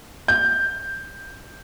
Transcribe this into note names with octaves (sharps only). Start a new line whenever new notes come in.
G6